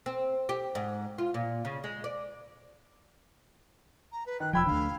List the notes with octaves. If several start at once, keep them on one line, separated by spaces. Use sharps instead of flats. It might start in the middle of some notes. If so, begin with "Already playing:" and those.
C4
G4
G#2
F4
A#2
C#3
G#3
D5
A#5
B4
D#3 F#6
E1 F3 G5 B5 E6 G#6
D2 D3 F5